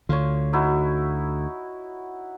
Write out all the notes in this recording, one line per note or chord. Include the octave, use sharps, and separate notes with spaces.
D2 D3 F4 C#5
D#4 E4 F#4